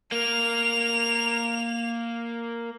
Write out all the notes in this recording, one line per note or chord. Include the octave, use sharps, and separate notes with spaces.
A#3 F7